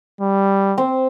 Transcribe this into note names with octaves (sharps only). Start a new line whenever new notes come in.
G3
C4